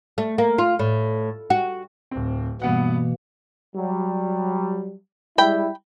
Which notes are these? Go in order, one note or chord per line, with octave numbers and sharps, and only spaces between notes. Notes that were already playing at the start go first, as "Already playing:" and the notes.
A3
A#3
F4
A2
F#4
D1 C4
G2 B2 E3 A#3 B3 F#5
F#3 G3
G3 G#3 E4 G5 B5